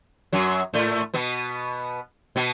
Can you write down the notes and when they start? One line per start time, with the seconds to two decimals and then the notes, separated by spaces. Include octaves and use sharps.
0.33 F#2 F#3
0.74 A2 A3
1.14 B2 B3
2.36 B2 B3